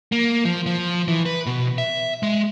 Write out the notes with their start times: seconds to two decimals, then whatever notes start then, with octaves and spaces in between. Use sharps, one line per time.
0.12 A#3
0.45 F3
0.66 F3
1.08 E3
1.26 B4
1.46 B2
1.78 E5
2.23 G#3